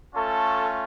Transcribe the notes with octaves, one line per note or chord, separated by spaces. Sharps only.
A3 C#4 F4 A4